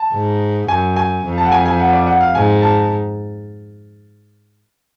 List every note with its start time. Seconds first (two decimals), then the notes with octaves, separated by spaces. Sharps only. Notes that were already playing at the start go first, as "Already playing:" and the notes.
Already playing: A5
0.13 G#2
0.68 F#2 G#5
0.96 G#5
1.24 F2
1.38 A5
1.45 F#5
1.52 G#5
1.66 G#5
1.79 F#5
1.93 D5
2.07 F#5
2.21 F5
2.35 G#2 G#5
2.62 A5